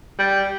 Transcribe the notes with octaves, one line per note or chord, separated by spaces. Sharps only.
G3